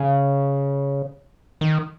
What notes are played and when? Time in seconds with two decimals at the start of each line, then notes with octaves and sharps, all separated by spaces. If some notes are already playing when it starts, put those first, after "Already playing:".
Already playing: C#3
1.61 D#3